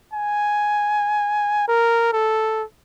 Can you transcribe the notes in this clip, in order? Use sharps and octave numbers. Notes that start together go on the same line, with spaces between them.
G#5
A#4
A4